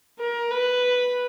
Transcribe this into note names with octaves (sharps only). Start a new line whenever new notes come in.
A#4
B4